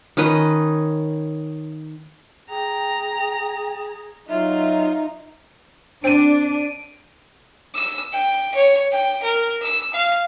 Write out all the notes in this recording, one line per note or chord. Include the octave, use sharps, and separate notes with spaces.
D#3 C#4 B4 D#5
G#4 G5 A#5
F#3 D#4 F4 E5
C4 D4 D7 D#7
E6
G5
C#5
G5
A#4
E6
F5